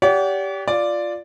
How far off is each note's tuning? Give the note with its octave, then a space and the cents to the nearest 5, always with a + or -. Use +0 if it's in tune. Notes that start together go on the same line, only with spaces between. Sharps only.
G4 +0 D5 -45 F#5 +0
F4 +0 D5 +0